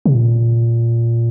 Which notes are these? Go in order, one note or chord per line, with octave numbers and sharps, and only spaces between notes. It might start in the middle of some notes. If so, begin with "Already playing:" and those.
C3
A#2